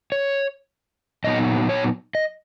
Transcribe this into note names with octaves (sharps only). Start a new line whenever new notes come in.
C#5
A#2 F#3 B3 D#4 D#5
C#5
D#5